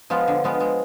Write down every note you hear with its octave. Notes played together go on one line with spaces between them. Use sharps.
F3 G#3 B3 F4
D3
F3 G#3 B3 F4
G#3